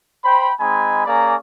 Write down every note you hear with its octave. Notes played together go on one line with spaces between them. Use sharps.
C5 G5 B5
G#3 C4 D#4 G#5 B5
A#3 C#4 G#4 D5 A#5